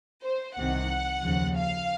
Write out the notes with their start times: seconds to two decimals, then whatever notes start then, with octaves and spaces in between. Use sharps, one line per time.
0.23 C5
0.57 C2 C3 D#3 F#5
1.23 D#2 C#3 F3
1.56 F5